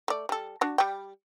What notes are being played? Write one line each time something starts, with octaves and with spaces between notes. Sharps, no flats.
A3 D5
G3 A4
D4 F#4
G3 G5